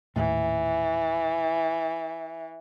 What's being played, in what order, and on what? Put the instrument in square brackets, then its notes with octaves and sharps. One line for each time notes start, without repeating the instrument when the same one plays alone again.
[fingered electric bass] D#1 D#2 A2 [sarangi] E3